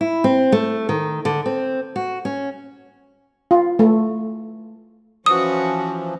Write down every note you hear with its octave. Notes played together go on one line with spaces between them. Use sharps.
E4
C4
A3
D#3
D3
C4
F#4
C#4
F4
A3
E3 F3 C#4 F#4 D#6